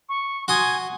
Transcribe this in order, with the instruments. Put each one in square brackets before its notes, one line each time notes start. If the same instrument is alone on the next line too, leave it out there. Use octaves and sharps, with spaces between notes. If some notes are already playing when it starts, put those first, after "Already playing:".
[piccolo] C#6
[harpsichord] F#4 C6 D#6 [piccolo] G#5